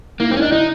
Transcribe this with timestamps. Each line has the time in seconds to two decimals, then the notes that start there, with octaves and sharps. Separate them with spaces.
0.20 A#3 E4
0.31 C4 E4
0.37 C#4
0.42 D4 D#4
0.52 D#4 E4